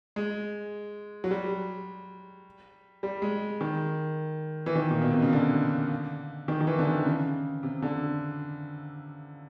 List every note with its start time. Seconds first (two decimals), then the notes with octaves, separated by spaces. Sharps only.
0.16 G#3
1.24 F#3
1.31 G3
3.03 G3
3.22 G#3
3.61 D#3
4.66 E3
4.75 D#3
4.91 A#2
5.01 B2
5.12 C3
5.22 C#3
5.33 D3
6.48 D#3
6.61 D#3
6.67 E3
6.79 D3
6.87 D#3
7.05 C#3
7.63 C3
7.82 D3